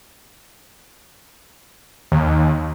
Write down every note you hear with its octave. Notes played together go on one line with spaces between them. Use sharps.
D#2